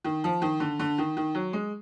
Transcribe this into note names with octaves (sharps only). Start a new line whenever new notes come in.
D#3
F3
D#3
D3
D3
D#3
D#3
F#3
G#3